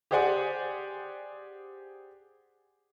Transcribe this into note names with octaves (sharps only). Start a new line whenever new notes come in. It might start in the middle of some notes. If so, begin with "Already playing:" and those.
G4 G#4 C5 D5 F#5 G#5